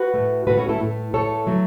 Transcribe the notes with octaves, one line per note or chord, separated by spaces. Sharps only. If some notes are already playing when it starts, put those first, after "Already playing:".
Already playing: F#4 B4
A2 A3
A2 A3 F#4 B4
C#4 F#4
E4 A4
A2 A3
A2 A3 A4 C#5
F#3 A3